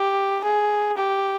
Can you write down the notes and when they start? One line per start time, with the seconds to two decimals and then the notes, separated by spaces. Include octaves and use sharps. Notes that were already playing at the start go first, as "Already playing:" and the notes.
Already playing: G4
0.44 G#4
0.97 G4